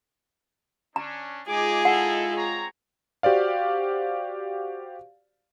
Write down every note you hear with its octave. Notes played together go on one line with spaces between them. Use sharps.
C#4 D4 A#5
G#3 D#4 F4 G#4 G#5 D6
D#4 E4 A4 F#5
C4 C#5 A#5
F#4 G4 C5 D5 F5